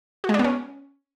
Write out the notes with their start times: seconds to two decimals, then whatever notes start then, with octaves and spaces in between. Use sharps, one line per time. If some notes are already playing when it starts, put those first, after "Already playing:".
0.24 F#4
0.29 G#3
0.34 D4
0.39 B3
0.44 C#4